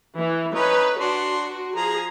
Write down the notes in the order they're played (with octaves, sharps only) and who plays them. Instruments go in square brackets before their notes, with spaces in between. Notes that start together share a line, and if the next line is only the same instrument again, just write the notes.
[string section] E3
[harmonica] C#4 D#4 C#5 [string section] B4
[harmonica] D4 C6 [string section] F#4
[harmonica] F3 A#5 [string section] G#4